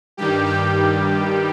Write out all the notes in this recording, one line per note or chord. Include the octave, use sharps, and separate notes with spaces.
G2 D#3 G3 G4
G4